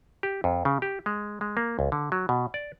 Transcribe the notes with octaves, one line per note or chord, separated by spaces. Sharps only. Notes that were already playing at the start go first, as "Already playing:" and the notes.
G4
F2
C#3
G4
G#3
G#3
A#3
C#2
D3
F#3
B2
D5